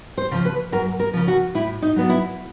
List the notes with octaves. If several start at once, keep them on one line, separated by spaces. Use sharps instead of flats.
C5
C#3 F3
B4
F#2 A#4
A#4
C#3 F3
F#4
A2 E4
D#4
F#3 B3 D4
E4